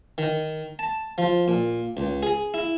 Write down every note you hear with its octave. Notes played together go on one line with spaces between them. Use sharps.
D#3
A5
F3
A#2
C#2
G#4
E4